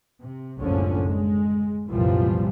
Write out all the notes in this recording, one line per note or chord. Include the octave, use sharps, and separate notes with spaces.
C3
F#1 C2 A2 D3 F3 C#4
G#3
C2 F#2 A#2 E3 F3 G3